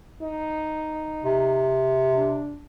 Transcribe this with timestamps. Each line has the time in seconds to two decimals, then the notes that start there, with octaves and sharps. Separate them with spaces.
0.22 D#4
1.24 C3
2.16 D4